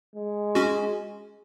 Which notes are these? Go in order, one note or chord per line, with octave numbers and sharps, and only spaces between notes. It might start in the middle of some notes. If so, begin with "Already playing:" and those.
G#3
C#4 F#4